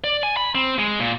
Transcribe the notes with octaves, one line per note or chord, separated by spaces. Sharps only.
D5
G#5
B5
C4
G#3
A#2